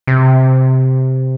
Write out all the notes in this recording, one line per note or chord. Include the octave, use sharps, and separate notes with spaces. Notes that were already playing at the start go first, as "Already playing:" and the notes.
C3